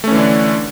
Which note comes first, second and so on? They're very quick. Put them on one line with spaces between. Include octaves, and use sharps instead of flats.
A3 C#4 E3 D3 D4